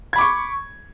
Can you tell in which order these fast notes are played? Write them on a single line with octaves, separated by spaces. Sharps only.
G#6 B5 D6 C#6